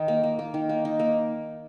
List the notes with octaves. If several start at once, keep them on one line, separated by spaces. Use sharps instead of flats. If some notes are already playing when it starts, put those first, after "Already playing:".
Already playing: D#3 D#4
A#3
A#3
A#3
D#3
A#3
D#4
A#3